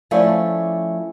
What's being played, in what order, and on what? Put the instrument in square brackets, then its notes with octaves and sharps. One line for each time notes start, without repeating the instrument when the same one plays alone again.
[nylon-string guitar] F3 A3 C#4 E4 D5